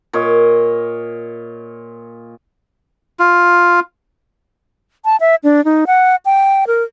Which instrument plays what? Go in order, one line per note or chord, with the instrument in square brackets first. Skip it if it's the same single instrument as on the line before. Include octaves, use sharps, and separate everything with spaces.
[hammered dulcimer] A#2 C#5 D#5
[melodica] F4
[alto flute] A5
E5
D4
D#4
F#5
G5
A#4